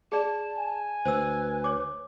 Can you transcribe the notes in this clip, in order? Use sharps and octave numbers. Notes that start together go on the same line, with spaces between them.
G#4 D5 A5
G#5
D2 B4 C5 E6
C#5 D6